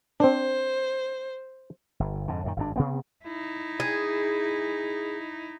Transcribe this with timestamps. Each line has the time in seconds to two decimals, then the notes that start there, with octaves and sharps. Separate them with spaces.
0.20 C4 D4 C5
2.00 G1
2.28 F2 G#2 D3
2.44 F#2 A#2 D#3
2.57 G#1 G2 D4
2.76 C3 B3 C4
3.24 D#4 E4
3.80 G#4